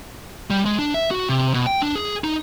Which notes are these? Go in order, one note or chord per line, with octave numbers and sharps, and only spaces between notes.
G3
G#3
D4
E5
F#4
C3
B2
G5
D4
G#4
D#4